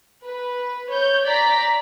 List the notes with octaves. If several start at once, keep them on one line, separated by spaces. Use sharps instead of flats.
B4
C#5 G6
D5 A#5 B6